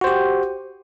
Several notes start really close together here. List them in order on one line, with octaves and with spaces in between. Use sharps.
F#4 C5 G4